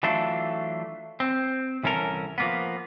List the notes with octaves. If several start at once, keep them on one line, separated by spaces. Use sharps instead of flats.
E3 F#3 A3 D4 F4 A4
C4
C2 E3 C#4 A4 A#4
F3 A#3 B3